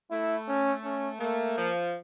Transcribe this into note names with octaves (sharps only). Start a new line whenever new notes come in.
A3 E4
C#4
C#4
A3 A#3
F3